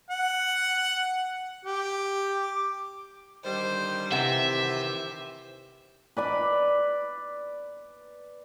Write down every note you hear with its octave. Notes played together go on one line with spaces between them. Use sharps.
F#5
G4
D6
D3 D#3 G3 C5
C3 D#3 E3 G4 C5 E5 F#5
B4 D5 B5